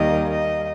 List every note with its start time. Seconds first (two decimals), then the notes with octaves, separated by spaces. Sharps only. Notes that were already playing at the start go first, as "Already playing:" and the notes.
Already playing: D#2 D#3 G3 A#3 D#5
0.30 D#5